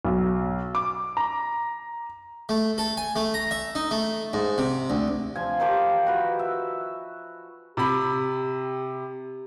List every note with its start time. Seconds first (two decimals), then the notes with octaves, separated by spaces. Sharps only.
0.05 B1
0.75 D6
1.17 A#5
2.49 A3
2.78 A4
2.97 G#5
3.16 A3
3.34 A#5
3.51 E5
3.75 D#4
3.91 A3
4.33 G#2
4.58 C3
4.90 D2
5.36 F3 G#5
5.60 D#3 F3 G4 D6
6.06 F#4 B4
6.39 E5
7.77 C3 G4 B5